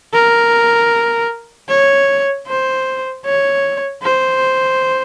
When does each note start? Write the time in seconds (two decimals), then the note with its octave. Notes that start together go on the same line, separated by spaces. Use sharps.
0.13 A#4
1.68 C#5
2.47 C5
3.26 C#5
4.03 C5